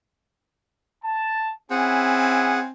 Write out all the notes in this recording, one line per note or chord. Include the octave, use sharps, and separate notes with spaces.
A5
C4 C#4 E4 G#4 F#5 G#5